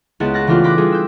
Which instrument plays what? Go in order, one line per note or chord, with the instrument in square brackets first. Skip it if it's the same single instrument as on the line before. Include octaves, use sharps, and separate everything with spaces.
[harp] C#2 B3 E4 F#5 A6
F#6 A6 A#6
C#3 E3 A3 D4 F4 G4
B5 D6 F#6 G6 A#6 B6
G3 F4 G#4
E6 G6